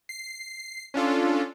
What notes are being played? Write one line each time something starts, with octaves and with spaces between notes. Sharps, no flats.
C7
C#4 D4 F4 A4